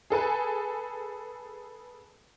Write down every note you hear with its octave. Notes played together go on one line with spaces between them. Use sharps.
G#4 A4 B4 G#5